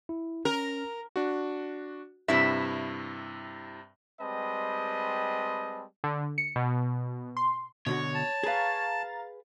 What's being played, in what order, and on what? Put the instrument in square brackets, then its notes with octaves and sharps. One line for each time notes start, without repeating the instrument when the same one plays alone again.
[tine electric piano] E4
[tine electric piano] C#4 [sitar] A#4
[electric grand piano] D4 F#4
[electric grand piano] G2 C3 [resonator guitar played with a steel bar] E4 E5
[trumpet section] G3 G#3 C4 B4 D#5 A5
[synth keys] D3
C#7
B2
C6
[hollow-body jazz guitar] B2 D3 F#4 [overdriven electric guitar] C#5
[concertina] A5
[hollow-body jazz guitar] G#4 B4 [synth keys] F5 A#5 A6